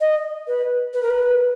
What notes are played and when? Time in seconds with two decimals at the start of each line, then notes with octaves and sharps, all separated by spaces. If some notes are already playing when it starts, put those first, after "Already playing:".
0.01 D#5
0.47 B4
0.93 B4
1.03 A#4
1.10 B4